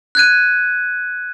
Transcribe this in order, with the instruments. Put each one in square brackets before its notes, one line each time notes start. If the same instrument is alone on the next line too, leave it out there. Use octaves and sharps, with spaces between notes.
[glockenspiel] F#6 G#6 D#7